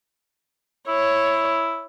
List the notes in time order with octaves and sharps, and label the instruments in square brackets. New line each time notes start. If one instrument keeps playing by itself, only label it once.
[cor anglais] E4 [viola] C#5